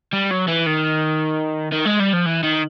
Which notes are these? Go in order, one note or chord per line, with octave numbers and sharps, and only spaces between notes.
G3
F#3
E3
D#3
D#3
G#3
G3
F3
E3
D#3